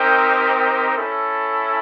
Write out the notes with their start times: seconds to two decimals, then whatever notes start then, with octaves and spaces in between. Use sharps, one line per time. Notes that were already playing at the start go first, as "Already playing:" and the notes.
Already playing: C4 D#4 G4 A#4
0.96 C#4 E4 A4